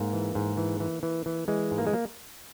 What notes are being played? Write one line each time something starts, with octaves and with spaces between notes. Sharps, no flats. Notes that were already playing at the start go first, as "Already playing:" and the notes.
Already playing: G#2 A#3
E3
G#2
E3
E3
E3
E3
E3 G#3
G#2
A#3
G#3
A#3